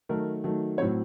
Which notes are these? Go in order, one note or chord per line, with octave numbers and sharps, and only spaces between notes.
D#3 F#3 A3 A#4
D#3 F#3 A3
A2 F#3 C4 C#5